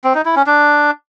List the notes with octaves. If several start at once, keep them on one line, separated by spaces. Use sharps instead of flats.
C4
D#4
E4
C#4
D4